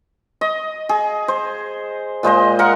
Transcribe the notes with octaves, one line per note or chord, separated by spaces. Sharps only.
D#5
G#4
C5
A#2 G#3 C5 D#5
A#4 F5 F#5